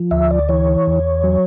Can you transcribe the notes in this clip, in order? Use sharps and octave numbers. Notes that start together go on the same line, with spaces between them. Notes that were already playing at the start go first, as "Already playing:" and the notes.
Already playing: F3
D2 E5
D5
E3 C#5
E2
F#3